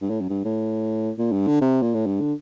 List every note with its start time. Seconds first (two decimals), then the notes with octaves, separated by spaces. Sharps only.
0.01 G2
0.10 A2
0.21 F#2
0.30 G2
0.45 A2
1.18 A#2
1.32 G2
1.47 D3
1.61 C3
1.82 A#2
1.94 A2
2.06 G2
2.20 D3